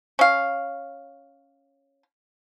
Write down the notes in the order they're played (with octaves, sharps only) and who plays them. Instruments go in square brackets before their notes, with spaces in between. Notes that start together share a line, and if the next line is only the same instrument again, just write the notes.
[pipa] C#4 F5